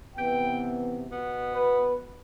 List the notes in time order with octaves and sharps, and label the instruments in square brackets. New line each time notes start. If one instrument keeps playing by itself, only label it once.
[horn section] C3 E3 B3 G5
B2 B3
B4